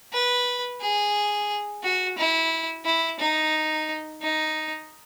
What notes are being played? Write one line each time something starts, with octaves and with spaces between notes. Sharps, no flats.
B4
G#4
F#4
E4
E4
D#4
D#4